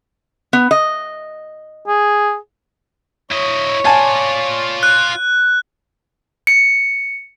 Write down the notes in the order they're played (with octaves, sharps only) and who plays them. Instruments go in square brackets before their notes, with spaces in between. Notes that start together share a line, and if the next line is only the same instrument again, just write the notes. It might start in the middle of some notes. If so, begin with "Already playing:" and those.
[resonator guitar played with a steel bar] B3
D#5
[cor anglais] G#4
[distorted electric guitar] E4 D#5 [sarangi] C#5
[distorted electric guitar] F4 D5 [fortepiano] G#5 A5
[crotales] F#6
[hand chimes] C#7